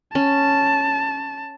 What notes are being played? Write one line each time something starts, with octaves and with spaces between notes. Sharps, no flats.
C#4 A5